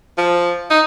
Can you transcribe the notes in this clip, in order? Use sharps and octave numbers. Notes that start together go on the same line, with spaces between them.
F3
D#4